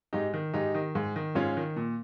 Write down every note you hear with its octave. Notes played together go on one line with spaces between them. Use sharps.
G#2 D#4 G4
D#3
G#2 D#4 G4
D#3
G#2
D#3
G#2 C#4 F4
D#3
A#2